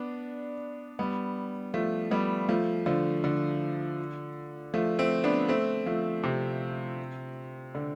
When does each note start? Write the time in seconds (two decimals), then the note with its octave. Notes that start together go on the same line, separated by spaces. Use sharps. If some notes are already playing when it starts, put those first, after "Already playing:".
Already playing: B3 D4
0.99 G3 B3
1.74 F3 A3
2.11 G3 B3
2.48 F3 A3
2.86 D3 F3
3.24 D3
4.74 F3 A3
4.99 A3 C4
5.24 B3 D4
5.48 A3 C4
5.86 F3 A3
6.23 C3
7.75 D3